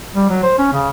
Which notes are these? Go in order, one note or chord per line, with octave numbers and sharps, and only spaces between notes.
G3
F#3
C5
C#4
C#3